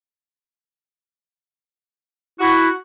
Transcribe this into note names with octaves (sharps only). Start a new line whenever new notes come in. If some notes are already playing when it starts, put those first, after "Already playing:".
E4 F#4